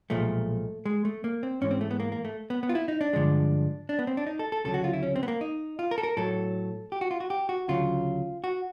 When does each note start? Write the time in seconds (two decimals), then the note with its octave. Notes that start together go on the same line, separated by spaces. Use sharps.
0.10 B1 A#2 F3 G#3 A3
0.85 G#3
1.05 A3
1.24 A#3
1.43 C4
1.61 G#2 E3 G#3 C#4
1.71 C4
1.81 A3
1.91 B3
2.00 A#3
2.12 A#3
2.25 A3
2.50 B3
2.63 B3
2.69 F4
2.75 E4
2.88 D#4
3.01 D4
3.13 G2 D3 F3 G#3
3.89 D4
3.99 B3
4.07 C4
4.17 D4
4.27 D#4
4.39 A4
4.52 A4
4.64 D2 C#3 F#3 A4
4.74 F#4
4.84 F4
4.93 E4
5.03 C#4
5.16 C4
5.23 B3
5.28 A#3
5.41 D#4
5.79 F4
5.91 A#4
5.98 A4
6.03 A#4
6.17 A2 F#3 A4
6.92 G4
7.01 F#4
7.11 F4
7.20 F#4
7.30 G4
7.49 F#4
7.68 D2 C#3 F#3 F4
8.44 F#4